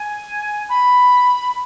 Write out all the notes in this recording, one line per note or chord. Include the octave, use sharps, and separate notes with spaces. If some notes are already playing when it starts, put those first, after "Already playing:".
Already playing: G#5
B5